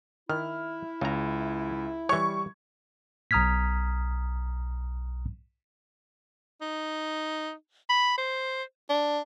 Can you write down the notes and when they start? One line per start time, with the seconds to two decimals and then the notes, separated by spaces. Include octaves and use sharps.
0.30 D#3 E4 F6
1.01 C#2 C#3 A#5
2.09 E3 G3 C#5 C#6 G#6
3.31 B1 A#5 D#6 F6 G#6 B6
6.62 D#4
7.90 B5
8.18 C5
8.90 D4